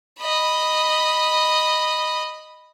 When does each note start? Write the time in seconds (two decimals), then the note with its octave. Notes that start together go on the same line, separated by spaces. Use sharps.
0.20 D#5 B5